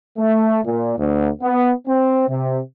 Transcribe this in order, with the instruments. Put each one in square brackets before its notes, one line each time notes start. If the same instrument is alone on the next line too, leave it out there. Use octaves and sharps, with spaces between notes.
[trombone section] A3
A#2
D2
B3
C4
C3